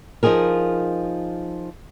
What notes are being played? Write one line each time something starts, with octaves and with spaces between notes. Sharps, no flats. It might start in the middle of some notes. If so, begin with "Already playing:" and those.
F3 D#4 F4 G#4 A#4